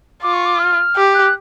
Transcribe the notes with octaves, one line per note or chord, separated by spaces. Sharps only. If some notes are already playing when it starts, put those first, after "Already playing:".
F4 D6
C#6
D6
F6
G4
F#6